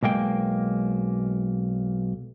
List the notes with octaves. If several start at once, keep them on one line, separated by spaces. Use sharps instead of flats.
B1 G#3 A#3 G5